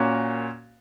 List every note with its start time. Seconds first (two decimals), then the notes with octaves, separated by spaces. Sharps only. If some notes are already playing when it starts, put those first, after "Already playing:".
Already playing: A#2 A#3 C#4 F#4